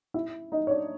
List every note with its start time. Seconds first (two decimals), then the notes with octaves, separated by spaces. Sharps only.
0.14 E4 E5
0.52 D#4 D#5
0.67 C#5
0.71 D4 D5